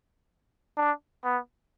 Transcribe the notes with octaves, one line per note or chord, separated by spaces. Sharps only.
D4
B3